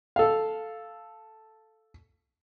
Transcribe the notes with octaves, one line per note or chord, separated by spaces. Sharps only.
A4 F5